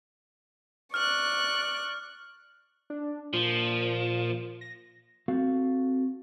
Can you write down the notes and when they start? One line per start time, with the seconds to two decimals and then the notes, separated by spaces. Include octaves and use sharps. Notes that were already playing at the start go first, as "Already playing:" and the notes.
0.94 D5 C#6 F6 F#6
2.90 D4
3.33 A#2 F3
4.61 A#6
5.28 C4 F#4 A4 F5